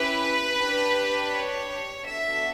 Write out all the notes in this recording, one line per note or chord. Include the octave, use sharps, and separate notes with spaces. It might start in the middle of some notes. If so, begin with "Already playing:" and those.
Already playing: C#4 E4 G4 B4
D4 G4
C#5
B3 D4 F#4 A4 E5